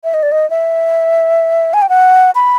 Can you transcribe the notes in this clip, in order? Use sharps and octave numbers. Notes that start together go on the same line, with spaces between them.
E5
D#5
D5
D#5
E5
G#5
G5
F#5
B5